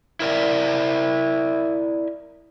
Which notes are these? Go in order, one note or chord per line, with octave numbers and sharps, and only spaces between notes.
E4 A#4 D5 E5